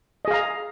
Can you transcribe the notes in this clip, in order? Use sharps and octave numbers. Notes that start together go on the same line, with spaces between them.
G#4 D#5 F5 A#5